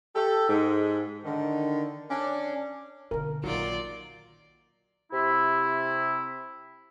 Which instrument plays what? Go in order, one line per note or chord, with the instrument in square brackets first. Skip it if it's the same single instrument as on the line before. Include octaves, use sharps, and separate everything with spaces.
[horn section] G4 A4
G#2
D3 D#3
C#4 D4
[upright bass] B2 D3 [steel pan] A#4
[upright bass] A#1 [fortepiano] D#3 F#3 [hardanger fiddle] F4 D5
[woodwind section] C3 E4